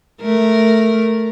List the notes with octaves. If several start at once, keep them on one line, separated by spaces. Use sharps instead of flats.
A3 A#4